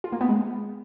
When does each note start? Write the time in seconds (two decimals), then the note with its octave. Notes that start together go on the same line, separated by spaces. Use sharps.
0.04 F4
0.12 A#3
0.21 B3
0.29 G#3